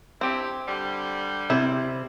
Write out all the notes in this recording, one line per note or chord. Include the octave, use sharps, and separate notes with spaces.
C4 D4 E4 G4
D3 G3
C3 E4